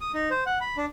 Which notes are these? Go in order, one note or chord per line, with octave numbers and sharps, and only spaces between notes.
D#6
D#4
C5
F#5
B5
D4